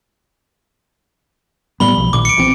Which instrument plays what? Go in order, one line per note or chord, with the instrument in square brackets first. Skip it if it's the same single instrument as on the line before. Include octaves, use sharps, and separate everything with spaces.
[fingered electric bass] A2 G3 B3 [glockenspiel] B5 G7
[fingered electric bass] B1 F3
[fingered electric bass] A#1 A#2 D#3 [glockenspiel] D6
[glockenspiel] C#7 D7
[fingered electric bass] A#1 E3 C4